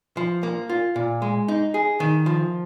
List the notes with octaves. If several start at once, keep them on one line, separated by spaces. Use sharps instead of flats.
F3
A#3
F4
A#2
G#3
D#4
G#4
D#3
F3